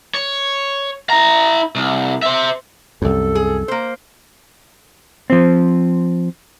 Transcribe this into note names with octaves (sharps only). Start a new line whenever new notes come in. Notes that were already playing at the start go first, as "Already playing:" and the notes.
C#5
E4 A#5
C2
C5 E5
C2 F#2 A4
G#4
A#3 C5
F3 C4